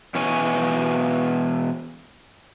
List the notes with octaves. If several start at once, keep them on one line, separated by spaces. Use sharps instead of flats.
B2 E3 C#5 G#5